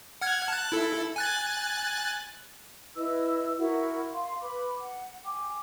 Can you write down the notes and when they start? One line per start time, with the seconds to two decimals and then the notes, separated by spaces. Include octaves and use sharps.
0.21 F#5 F6 G#6
0.48 A5 F#6
0.72 E4 A4
1.16 G#5 F#6 A6
2.95 E4 B4 D#5 E6
3.58 E4 F#4 A#4 F#5
4.13 F5 C6
4.41 B4 B5 D6
4.81 F#5
5.25 G5 G#5 D6